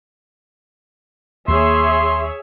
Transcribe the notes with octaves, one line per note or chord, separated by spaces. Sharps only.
D#2 A#3 G#4 C#5 E5 C6